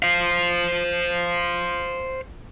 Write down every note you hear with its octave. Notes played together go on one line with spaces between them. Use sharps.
C5 F5